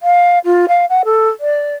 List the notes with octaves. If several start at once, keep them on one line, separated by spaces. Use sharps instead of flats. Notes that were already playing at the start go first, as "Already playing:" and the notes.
F5
F4
F5
F#5
A4
D5